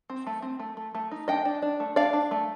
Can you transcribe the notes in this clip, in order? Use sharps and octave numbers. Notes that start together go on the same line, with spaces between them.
C4
A3
C4
A3
A3
A3
D#4
D4 D#5 G5
D4
D4
A3
D4 D5 F5
D4
A3